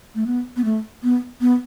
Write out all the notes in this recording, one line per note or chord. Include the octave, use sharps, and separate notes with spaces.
A3
B3
B3
A3
B3
B3